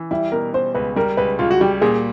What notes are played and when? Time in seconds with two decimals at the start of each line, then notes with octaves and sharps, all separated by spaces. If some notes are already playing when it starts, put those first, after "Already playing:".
Already playing: E3
0.11 G3 E4
0.32 B2 A#4
0.53 B2 C5
0.75 C#2 B4
0.96 G3 A#4
1.17 C#2 B4
1.39 C#2 F4
1.51 F#4
1.61 G3 G4
1.82 A#2 G#4